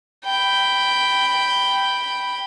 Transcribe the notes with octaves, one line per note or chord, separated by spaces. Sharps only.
G5 B5